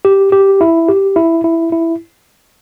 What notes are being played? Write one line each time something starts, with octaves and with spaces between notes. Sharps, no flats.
G4
G4
E4
G4
E4
E4
E4